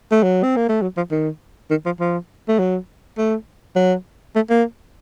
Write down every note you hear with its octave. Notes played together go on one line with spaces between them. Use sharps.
A3
F#3
C4
A#3
A3
F#3
F3
D#3
D#3
F3
F3
A3
F#3
A3
F#3
A3
A#3